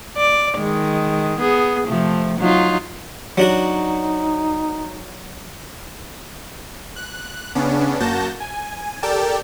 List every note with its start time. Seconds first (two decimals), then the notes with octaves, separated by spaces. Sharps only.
0.17 D5
0.57 D#3 G#3
1.39 B3 G#4
1.87 C3 F3 A3
2.39 F#3 D#4 F4
3.38 F#3 D4 D#4 F#4
6.96 F#6
7.55 C#3 B3 C#4 D4
8.00 F#2 A#3 F#4 A5 G6 A#6
8.40 G#5
9.03 G4 A4 A#4 D5 G5 A5